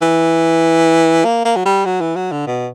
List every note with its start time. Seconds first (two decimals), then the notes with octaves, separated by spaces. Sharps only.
0.02 E3
1.24 A#3
1.45 A#3
1.56 F#3
1.65 G3
1.86 F#3
2.01 E3
2.16 F#3
2.32 D3
2.47 B2